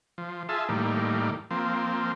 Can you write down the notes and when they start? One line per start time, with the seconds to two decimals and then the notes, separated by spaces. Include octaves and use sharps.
0.18 F3
0.49 F4 G#4 E5 A5
0.69 A2 D#3 G3 A#3
1.51 F3 A#3 C4